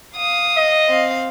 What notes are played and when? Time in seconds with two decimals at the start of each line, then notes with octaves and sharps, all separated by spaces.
0.16 F5 D#6
0.57 D#5
0.88 C4 F5